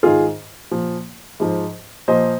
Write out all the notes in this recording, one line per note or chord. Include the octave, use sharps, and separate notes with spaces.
G#2 D#3 F4 G#4
A#2 F3
G#2 F3
A#2 F3 C5 D#5